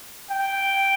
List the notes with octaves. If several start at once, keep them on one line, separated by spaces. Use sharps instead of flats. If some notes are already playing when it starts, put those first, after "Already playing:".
G5